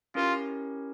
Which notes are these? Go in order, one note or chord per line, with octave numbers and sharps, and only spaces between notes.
C#4 E4 F4 G4 A#4 C#5